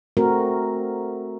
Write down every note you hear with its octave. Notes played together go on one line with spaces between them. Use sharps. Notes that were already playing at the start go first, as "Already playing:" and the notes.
A3 C4 F#4 A#4